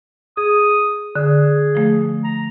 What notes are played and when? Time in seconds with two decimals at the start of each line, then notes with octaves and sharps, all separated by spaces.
0.37 G#4 D#6
1.16 D3 G#4
1.75 F3 A3
2.24 A#5